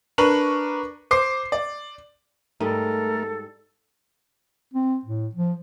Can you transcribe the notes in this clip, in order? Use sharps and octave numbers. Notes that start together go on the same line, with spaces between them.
D4 A#4 B4 C#6 F#7
C5 D6 C7
D5
G#2 G3 A3 A4 A#4 D#5
C4
A2
F3